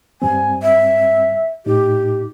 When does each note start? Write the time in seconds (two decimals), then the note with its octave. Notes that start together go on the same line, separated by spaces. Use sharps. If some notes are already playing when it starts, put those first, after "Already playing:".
0.22 G2 G3 C4 G#5
0.62 E5
1.66 A2 D#4 G4